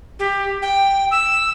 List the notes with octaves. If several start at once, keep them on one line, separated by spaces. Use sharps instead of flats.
G4
G5
E6